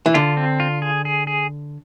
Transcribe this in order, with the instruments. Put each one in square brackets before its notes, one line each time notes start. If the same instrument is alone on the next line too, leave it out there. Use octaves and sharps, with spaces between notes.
[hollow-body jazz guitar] E3
[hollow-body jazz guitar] D3 [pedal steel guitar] F4
[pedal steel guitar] C4
F4
G#4
G#4
G#4